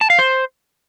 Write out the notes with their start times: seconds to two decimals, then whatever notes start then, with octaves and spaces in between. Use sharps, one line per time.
0.01 A5
0.10 F5
0.19 C5